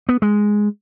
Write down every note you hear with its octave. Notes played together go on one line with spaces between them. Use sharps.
B3
G#3